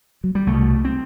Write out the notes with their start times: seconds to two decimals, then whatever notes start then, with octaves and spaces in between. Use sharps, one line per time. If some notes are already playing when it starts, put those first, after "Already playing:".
0.24 F#3
0.35 G3
0.47 C2 A3
0.53 B2
0.85 C4